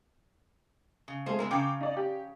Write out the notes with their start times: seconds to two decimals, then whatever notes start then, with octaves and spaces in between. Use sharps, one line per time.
1.08 C#3
1.26 G#3 A3 F4 G#4 C5
1.39 G#3 B3 E4 A#4
1.51 C#3 F#3 F5 G5 D6
1.81 D#4 D5
1.97 G4